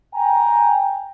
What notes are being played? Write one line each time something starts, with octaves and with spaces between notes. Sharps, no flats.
G5 G#5 A#5